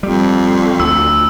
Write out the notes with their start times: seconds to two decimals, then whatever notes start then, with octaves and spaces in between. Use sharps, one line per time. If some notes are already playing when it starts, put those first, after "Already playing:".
0.03 F2 G3
0.80 D2 E6